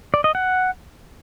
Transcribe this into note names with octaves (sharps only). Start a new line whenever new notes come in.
D5
D#5
F#5